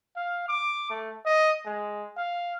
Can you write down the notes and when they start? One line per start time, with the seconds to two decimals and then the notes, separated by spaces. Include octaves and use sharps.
0.16 F5
0.48 D6
0.90 A3
1.26 D#5
1.66 G#3
2.17 F5